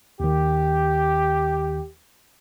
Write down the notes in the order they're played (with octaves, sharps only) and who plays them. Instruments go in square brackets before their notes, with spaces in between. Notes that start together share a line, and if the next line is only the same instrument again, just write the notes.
[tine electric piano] D#2 D#3 [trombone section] G4